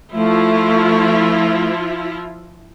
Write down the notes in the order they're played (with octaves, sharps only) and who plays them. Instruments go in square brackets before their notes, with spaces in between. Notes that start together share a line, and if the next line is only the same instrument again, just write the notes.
[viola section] F3 E4 F4 [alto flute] A3